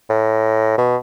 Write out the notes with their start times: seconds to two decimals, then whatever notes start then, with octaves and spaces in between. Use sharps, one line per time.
0.10 A2
0.78 B2